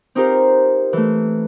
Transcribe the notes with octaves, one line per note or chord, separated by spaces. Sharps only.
C4 D#4 F4 G4 A#4 C5
E3 A3